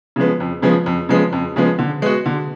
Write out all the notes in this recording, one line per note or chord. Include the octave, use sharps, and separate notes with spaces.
C#3 F3 G#3 B3
F2
C#3 F3 G#3 B3
F2
C#3 F3 G#3 B3
F2
C#3 F3 G#3 B3
D3
G#3 B3 F#4
D3